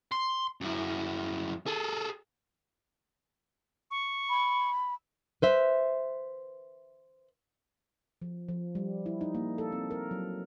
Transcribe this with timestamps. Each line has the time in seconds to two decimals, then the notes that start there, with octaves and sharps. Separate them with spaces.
0.12 C6
0.61 F#2 E4
1.66 G#4 A4
3.91 C#6
4.29 B5
5.42 B4 C5 E5
8.22 F3
8.48 F3
8.75 G3
9.06 E4
9.21 D#4
9.35 A#3
9.58 A4
9.72 C4
9.91 A#4
10.11 F#3